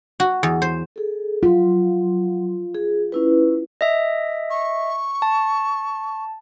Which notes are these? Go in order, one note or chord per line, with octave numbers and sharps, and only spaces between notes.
F#4
E2
C5
G#4 A4
F#3 F4 C6
G#4
C#4 E4 B4
D#5 E5
C#6
A5